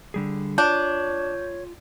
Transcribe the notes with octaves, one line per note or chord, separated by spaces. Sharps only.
D3 G3 G#4
D4 F4 C#5 G6